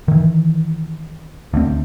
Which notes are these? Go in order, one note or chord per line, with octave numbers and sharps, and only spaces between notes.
D#3 E3
D2 C4